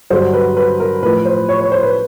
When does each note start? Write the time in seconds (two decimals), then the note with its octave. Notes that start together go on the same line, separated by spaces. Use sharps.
0.10 G2 D3 F#3 C5
0.33 B4
0.57 B4
0.80 A#4
1.02 A2 F3 B4
1.26 C5
1.49 C#5
1.61 C#5
1.72 C5
1.83 B4